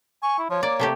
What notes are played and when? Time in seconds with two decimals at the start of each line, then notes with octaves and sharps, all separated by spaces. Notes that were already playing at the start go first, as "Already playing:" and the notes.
0.23 G#5 C#6
0.39 E4
0.50 F3 C#5
0.63 A#3 D5
0.80 C3 A3 G4